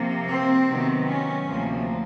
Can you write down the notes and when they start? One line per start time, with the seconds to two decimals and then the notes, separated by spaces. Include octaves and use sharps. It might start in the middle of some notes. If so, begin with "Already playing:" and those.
Already playing: C3 F3 A#3
0.28 C4
0.67 C3 D#3 F#3 B3
1.07 C#4
1.46 D2 C3 F3 A#3